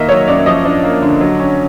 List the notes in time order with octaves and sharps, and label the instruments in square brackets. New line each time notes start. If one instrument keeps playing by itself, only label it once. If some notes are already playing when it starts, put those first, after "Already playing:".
Already playing: [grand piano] D#3 A#3 [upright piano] D#5 E5
[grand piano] F#3 [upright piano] C#5
[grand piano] F#2 [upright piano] D5
[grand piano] F3 [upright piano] D#5
[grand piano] D4
A#3
D3
F#3
C#4